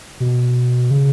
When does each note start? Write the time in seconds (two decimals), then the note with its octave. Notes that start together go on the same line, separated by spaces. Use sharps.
0.20 B2
0.91 C#3